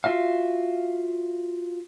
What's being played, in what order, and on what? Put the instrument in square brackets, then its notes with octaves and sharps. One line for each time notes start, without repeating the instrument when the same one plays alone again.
[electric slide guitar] F4 F#4 E5 F5